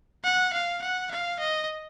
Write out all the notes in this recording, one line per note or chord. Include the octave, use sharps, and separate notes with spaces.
F#5
F5
F#5
F5
D#5